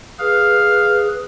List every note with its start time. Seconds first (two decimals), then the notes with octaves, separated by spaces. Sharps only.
0.19 G#4 B4 F5